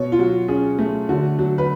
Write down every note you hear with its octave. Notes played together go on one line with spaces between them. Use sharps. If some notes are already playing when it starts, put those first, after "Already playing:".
Already playing: B2 C#5
F4
F#3 F#4
C#4 G#4
A3
D3 F#4
F#3
B4